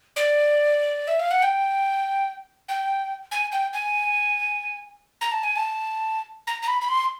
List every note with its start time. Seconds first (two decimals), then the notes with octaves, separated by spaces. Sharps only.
0.16 D5
1.08 E5
1.20 F5
1.31 F#5
1.43 G5
2.69 G5
3.31 G#5
3.52 G5
3.73 G#5
5.21 A#5
5.32 A5
5.43 G#5
5.56 A5
6.47 A#5
6.62 A#5
6.68 B5
6.81 B5
6.89 C6